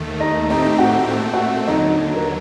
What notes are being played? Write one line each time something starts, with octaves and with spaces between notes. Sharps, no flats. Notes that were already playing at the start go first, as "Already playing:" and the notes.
Already playing: D#2 D#3 A3
D#4 D#5
A2 A3 C4 D#4 G4 D#5
F#4 F#5
A#2 A3 C4 F#5
F#4 F#5
D#2 D3 F#3 D#4 D#5
A#4